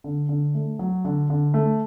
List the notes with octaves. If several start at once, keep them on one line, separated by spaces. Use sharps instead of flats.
D3
D3
A3
F#3
D3
D3
A3